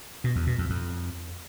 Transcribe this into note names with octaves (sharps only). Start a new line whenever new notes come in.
B2
E2
B2
F2
F2